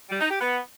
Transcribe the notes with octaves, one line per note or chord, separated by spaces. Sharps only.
G3
D#4
G4
B3